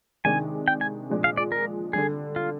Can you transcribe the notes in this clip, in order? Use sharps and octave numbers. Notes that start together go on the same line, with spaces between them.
C3 D#3 G#3 D4 G#5
G5
G#5
A#2 F3 G#3 D4
F5
D5
A#4
D3 G3 D4 G#4
F4